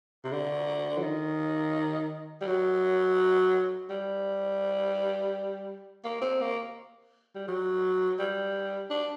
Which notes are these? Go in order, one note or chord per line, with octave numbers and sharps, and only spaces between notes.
C3
D3
F#3
D#3
G3
F#3
G3
A#3
C4
A#3
G3
F#3
G3
D4